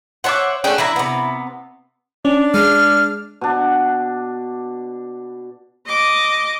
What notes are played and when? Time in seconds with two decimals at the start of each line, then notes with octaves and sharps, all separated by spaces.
0.24 C5 C#5 E5 F#5 A5 D6
0.64 A3 C#4 D4 G#4 F#5 G5
0.78 E3 D4 E4 E5 A#5
0.96 C3 B3
2.25 C#4 D4
2.54 G#3 F6
3.41 B2 D4
5.86 D#5 D6